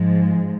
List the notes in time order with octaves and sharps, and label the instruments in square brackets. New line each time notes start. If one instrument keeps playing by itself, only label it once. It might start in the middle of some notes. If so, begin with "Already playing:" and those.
Already playing: [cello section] G#2 F3 G#3